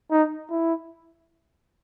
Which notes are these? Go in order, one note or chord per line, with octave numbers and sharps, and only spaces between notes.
D#4
E4